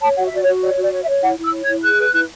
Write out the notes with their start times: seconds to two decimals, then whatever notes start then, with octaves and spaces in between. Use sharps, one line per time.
0.02 C#5 A5
0.17 F#4 F#5
0.26 E5
0.31 F#4 D5
0.43 C#5
0.47 F#4
0.62 C#5 D5
0.77 F#4
0.82 D5
0.93 C#5
1.02 E5
1.08 C#5
1.23 E4 F#5
1.38 E4 E6
1.53 C#5
1.64 G#6
1.68 E4
1.83 G#4 F#6
1.99 B4
2.14 E4